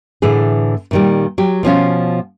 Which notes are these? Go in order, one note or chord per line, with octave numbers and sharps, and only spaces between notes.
A2 D3 E3 G#4
A#2 D#3 G3
F#3 G4
B2 F3 C#4 F4